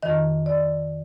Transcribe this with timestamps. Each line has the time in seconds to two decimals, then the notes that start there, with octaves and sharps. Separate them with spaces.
0.03 F2 D#3 D#5
0.46 D5